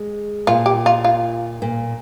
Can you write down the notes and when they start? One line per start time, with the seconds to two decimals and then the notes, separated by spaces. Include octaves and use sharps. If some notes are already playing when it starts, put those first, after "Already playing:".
Already playing: G#3
0.47 A#2 F4
0.66 G4
0.86 F4
1.04 F4
1.62 A#2